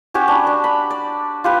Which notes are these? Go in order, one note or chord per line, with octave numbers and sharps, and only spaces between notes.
C#4 F#4 G4 C#5
D4 B5
D4
B5
D5
F4 G4 B4